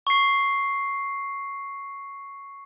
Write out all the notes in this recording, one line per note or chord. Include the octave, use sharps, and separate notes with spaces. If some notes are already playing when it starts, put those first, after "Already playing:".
C#6 C7